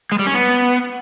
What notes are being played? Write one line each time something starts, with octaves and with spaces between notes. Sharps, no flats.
G#3
G3
C#4
B3